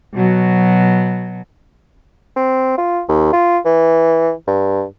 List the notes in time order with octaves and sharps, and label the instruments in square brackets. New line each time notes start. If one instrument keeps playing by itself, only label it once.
[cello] B2 F#3
[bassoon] C4
F4
D#2
F4
E3
G2